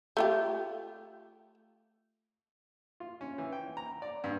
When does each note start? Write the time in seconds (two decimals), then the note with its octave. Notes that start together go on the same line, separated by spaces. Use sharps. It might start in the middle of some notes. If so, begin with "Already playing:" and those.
0.17 A3 F4 G4
3.00 F4
3.21 C#4
3.38 E3
3.52 G5
3.77 A#5
4.02 D5
4.24 G2